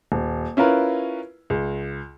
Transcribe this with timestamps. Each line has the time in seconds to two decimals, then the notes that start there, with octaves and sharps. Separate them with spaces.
0.12 D#1
0.57 C#4 E4 F4 A#4 B4
1.50 C#2